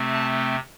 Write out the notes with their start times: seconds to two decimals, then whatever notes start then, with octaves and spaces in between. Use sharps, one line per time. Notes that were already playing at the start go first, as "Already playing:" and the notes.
Already playing: C3 A3 C4
0.13 A5